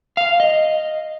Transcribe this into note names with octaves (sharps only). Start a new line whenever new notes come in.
F5
D#5